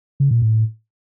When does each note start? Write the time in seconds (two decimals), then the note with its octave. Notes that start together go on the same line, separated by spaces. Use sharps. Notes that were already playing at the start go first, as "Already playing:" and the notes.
0.20 C#3
0.31 A#2
0.42 A2